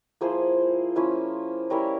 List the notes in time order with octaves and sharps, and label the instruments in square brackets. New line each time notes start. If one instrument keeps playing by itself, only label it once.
[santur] F3 A#3 E4 G#4 C5
F3 A#3 C#4 E4
G3 C#4 E4 A#4 C#5